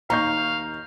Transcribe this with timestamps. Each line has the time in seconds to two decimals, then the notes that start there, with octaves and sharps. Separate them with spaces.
0.10 D#2 D#4 F5 A#5 C#6 G6